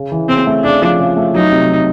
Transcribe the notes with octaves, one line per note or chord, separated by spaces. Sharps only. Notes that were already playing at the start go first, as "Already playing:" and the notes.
Already playing: C#3
E3
C#3 C4
A3
C#3 D4
F3
C#3
A3
F#3 D#4
C3